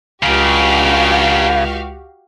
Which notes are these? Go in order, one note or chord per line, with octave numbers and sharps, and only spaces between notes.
C#2 C#3 D4 F#4 G4 A#4 F5